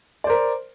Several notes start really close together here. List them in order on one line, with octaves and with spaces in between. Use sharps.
D5 C5 A#4